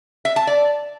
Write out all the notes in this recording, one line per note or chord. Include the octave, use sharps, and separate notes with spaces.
E5
A5
D5